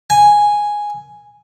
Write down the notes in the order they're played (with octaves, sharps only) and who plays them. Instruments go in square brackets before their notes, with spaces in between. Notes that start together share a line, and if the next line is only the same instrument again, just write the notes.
[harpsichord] G#5